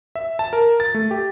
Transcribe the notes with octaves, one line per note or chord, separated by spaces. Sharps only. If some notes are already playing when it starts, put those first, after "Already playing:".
E5
A5
A#4
A6
A3
G4